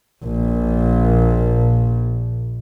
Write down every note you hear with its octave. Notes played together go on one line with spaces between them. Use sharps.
A#1 A#2